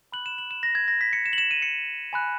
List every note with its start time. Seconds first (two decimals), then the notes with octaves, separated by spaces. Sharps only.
0.12 B5 F#6 F#7
0.26 E7
0.38 F#7
0.51 E7
0.63 A#6
0.75 G#6
0.88 A#6
1.01 B6
1.13 C#7
1.26 E7
1.33 F#7
1.38 E7
1.51 D#7
1.62 C#7
2.13 G#5 B5 F#6